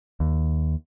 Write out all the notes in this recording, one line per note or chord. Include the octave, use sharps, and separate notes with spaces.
D#2